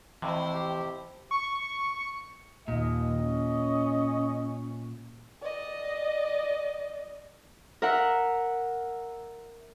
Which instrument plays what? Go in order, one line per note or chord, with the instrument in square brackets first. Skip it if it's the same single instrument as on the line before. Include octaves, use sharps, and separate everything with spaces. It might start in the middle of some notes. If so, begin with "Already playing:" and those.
[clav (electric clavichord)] F2 A2 C3 [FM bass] E3 [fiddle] E4 C5
[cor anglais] G4
[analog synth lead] C#6
[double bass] D#2 [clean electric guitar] A#2 [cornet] D#5
[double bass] C#4
[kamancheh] D5 D#5
[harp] A#4 E5 F#5